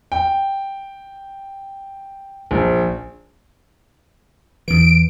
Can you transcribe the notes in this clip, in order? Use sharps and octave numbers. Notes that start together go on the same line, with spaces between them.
G5
A#1
E2 E3 D7